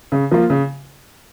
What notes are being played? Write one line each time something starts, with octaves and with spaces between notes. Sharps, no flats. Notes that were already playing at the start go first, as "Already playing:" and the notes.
C#3
F3 A#3 F4
C#3